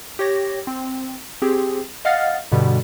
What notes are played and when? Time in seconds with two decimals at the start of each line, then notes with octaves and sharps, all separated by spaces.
0.19 G4 C#5 A#6
0.67 C4
1.42 C4 G4 G#4
2.05 D#5 F5 F#5 F6 A6
2.52 G2 B2 D3 G3